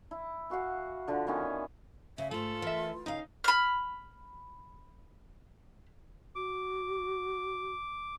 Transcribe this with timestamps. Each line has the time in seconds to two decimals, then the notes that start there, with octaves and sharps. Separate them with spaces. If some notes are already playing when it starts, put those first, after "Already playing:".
0.11 E4
0.50 E3 F#4 F5 F#5
1.08 D3 F3
1.27 D#3 E3 B3 C#4
2.18 C#3 E5
2.31 G#2 A3 F4 A4
2.62 E3 A#4 E5
3.06 C#3 D#4 F5
3.44 B5 F6
6.35 F#4 D6